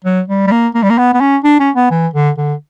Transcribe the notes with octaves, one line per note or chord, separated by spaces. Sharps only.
F#3
G3
G3
A#3
A#3
G3
A#3
B3
B3
C#4
D4
C#4
B3
E3
D3
D3